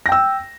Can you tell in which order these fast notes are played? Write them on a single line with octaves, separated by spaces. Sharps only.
A#6 G5 E6